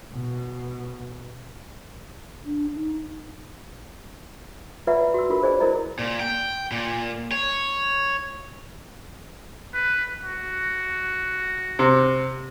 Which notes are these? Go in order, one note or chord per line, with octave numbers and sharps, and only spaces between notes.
B2
D4
D#4
F4 B4 D5 E5 F#5 A#5
F#4 E6
D4 F4 A#4
G#4 C5 D5 D#5 G#5
E4 A#4 C5 D5 D#5 A#5
A#2
G5
A#2
C#5
B4
F#4
C3